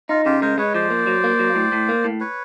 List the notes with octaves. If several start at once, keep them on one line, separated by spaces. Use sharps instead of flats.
D#4 F4
C#3 F4 G4
G#3 A#4 C5
G#3 B4 C#5
F3 C5 D5
A#3
F#3
A#3
F#3
A2
A2
A#3
A2
B4 C#5